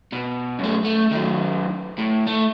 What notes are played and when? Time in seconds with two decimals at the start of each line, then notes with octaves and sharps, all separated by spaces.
0.13 B2
0.59 F#2 A3
0.85 A3
1.12 D#3 F#3
1.99 A2
2.27 A3